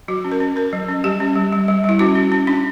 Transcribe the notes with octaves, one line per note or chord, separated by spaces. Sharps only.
F#3 F#4
C#4
A#4
C#4
C#4 A#4
F#3
C#4
G3 G4
C#4
G3
G3
G3
G3 E4
C#4 F#4
C#4
C#4
C#4 D4